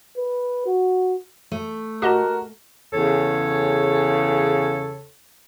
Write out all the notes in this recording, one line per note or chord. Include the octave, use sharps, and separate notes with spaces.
B4
F#4
A3
F#4 G4 A#4 D#5 A5
E2 C#3 A4 C#5